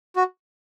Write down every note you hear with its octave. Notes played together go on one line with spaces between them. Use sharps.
F#4